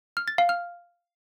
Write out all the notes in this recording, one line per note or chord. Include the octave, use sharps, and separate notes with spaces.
F6
A6
F5
F6